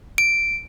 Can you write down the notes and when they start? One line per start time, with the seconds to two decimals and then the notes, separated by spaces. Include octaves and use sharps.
0.18 D7